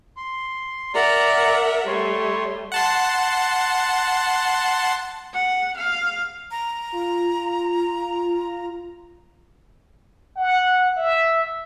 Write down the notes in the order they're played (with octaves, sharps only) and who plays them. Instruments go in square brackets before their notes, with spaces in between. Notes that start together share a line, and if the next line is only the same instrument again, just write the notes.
[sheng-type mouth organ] C6
[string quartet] A#4 E5 F#5 [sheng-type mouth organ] D5 A#5
[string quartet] G3 A3 [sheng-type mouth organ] C#5 C6
[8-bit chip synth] F#5 A5 C6
[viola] F#5
F5
[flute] A#5
[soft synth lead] F4
[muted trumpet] F#5
E5